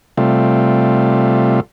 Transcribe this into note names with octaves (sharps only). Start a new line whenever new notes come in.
C3 G3 A3 F4